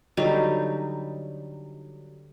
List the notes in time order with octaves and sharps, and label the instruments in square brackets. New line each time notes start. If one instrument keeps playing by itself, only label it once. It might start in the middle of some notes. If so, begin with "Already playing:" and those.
[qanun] D3 F#3 G3 D#4